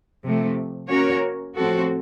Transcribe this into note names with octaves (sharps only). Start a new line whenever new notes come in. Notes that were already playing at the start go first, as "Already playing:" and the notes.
C3 F3 A3
A#3 C#4 F#4 A#4 C#5
A2 F3 C4 F#4 A4